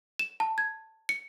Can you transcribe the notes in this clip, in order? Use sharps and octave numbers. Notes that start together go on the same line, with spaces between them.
E7
A5
G#6
C#7